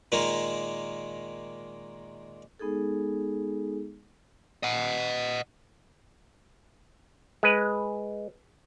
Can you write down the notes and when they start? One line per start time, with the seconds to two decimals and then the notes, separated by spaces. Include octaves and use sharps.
0.12 A#2 D#3 G#3 A#3
2.59 G#3 B3 D#4 G#4 A4
4.63 D#5 F#5
7.43 G#3 B4